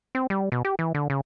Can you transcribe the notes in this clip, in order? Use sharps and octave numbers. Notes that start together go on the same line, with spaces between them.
C4
G3
B2
G4
E3
D3
C#3